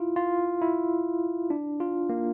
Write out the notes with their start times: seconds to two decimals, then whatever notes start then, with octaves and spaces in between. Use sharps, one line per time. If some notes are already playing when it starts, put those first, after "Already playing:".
Already playing: E4 F4
0.16 F4
0.61 E4
1.50 D4
1.80 F4
2.09 A#3